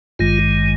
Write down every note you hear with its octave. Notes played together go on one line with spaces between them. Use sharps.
G#1 G2 D#3 G#3 F4